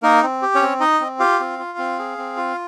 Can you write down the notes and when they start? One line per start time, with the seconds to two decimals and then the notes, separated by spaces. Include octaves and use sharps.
0.03 A#3 D#4 A#4
0.22 C4
0.42 G4
0.55 C#4 C#5
0.61 C4
0.80 D#4 D#5
1.00 C4
1.19 F4 G4 F5
1.40 C4
1.59 F4
1.78 C4
1.99 G#4
2.18 C4
2.37 F4